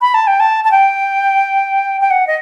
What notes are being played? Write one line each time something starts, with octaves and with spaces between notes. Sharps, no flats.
B5
A5
G5
A5
A5
G5
G5
F#5
D#5